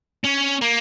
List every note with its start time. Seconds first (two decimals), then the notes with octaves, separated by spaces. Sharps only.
0.25 C#4
0.61 A#3